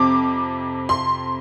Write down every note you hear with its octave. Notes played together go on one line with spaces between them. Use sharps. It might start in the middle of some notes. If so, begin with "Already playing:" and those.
Already playing: F2 C3 D6
C6